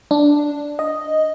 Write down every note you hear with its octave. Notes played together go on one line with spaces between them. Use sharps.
D4
D#5